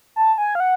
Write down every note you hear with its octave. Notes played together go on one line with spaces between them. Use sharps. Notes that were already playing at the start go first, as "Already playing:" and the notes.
A5
G#5
F5
F#5